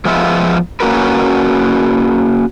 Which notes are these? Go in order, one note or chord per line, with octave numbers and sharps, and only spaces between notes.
F3 G#3 B3 F4 E5
A#3 C#4 F#4 A#4 B4